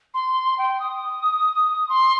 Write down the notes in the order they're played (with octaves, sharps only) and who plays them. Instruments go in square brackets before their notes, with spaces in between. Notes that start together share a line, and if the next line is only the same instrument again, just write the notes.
[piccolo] C6
G5
D#6
C6